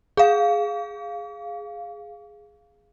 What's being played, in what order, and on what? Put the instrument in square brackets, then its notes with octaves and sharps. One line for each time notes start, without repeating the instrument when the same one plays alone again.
[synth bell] G#4 F5